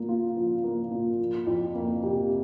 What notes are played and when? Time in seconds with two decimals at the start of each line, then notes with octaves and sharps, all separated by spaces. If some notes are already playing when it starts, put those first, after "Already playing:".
Already playing: A#2 A#3
0.09 F4
0.37 F3
0.64 A#3
0.91 A#2
1.20 F3
1.47 F2
1.75 A#3
2.03 C3